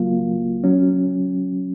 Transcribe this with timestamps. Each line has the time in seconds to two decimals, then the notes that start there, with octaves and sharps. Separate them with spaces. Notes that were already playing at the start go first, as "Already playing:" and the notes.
Already playing: C#2 C#3 F#3 A#3 F4
0.64 F#3 C#4